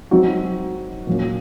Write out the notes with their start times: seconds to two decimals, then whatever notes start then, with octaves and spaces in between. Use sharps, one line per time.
0.11 F#3 C4 D#4 F#4
1.07 A#2 F#3 A#3 C#4